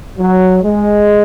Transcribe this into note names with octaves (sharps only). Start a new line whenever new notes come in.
F#3
G#3